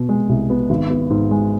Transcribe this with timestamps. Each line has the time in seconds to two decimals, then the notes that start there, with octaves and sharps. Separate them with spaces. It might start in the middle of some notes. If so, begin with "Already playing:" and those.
Already playing: B2 B3
0.09 G#3
0.29 C2
0.50 B3
0.70 G#1
0.90 B3
1.10 G#2
1.31 G#3